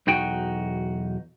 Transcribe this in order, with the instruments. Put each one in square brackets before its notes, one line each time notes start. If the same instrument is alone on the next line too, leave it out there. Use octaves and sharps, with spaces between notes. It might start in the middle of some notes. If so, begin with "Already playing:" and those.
[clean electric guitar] B1 E2 D#4 F#4 G5